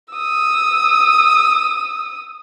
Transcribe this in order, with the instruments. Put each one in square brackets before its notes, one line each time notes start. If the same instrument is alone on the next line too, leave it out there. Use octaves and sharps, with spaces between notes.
[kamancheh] D#6 E6